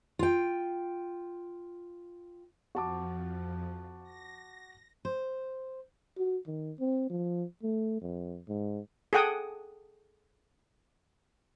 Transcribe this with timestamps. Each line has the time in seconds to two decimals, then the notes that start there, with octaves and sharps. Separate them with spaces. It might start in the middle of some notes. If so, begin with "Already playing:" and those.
0.19 F4 G5
2.75 F2 F3 F#4 A5 D6
4.03 A#6
5.05 C5
6.17 F#4
6.47 D#3
6.80 C4
7.10 F3
7.63 A3
8.01 F2
8.49 G#2
9.13 G#4 A4 F#5 G5 D#6